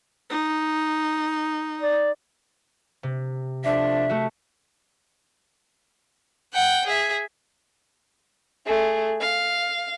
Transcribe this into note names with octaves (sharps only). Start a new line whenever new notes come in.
D#4
D5
C3
F3 A3 D4 E5
A3 F#4
F#5 G5
G#4 E5
A3 G#4
F5